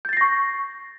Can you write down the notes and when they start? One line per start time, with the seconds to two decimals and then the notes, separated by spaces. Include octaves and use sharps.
0.05 G6
0.09 A6
0.13 C7
0.17 A#6
0.21 C#6